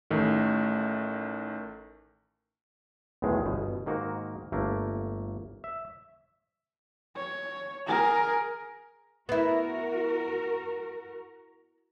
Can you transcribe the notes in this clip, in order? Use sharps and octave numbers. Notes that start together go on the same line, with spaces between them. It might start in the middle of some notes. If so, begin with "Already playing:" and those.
A1 D#3 A3
B1 E2 A2 D#3 G#3
G1 B2
G#2 D#3 A#3 F#4
G1 A3 A#3
E5
C#5
G#4 A#4
B3 E4 F#4 A#4